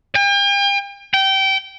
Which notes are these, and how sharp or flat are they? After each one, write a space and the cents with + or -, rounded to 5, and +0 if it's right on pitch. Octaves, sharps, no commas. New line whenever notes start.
G5 +40
G5 -20